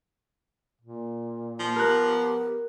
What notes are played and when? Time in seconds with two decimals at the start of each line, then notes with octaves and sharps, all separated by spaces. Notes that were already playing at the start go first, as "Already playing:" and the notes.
0.81 A#2
1.59 F3 A#3
1.76 B3 G4 A#4 F#6